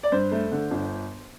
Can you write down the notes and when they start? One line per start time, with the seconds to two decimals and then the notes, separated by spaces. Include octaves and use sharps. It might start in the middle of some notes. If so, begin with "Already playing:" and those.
0.03 D5
0.12 G2 C5
0.31 A3
0.52 D3
0.71 G1